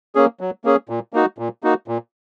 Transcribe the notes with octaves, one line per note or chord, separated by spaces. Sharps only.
A#3 C#4 G#4
F#3
A#3 C#4 G#4
A#2
A#3 D#4 F#4
A#2
A#3 D#4 F#4
A#2